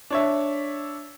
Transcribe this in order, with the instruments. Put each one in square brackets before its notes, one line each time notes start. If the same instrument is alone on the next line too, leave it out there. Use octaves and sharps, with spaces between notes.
[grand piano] D4 C#5 E5